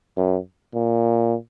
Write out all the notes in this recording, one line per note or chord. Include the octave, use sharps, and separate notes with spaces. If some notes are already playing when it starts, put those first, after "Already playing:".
F#2
A#2